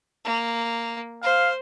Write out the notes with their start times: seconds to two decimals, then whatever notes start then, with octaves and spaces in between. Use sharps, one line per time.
0.25 A#3
1.23 C5 F5